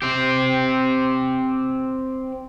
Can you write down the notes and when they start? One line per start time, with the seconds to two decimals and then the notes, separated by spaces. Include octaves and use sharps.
0.02 C4 G4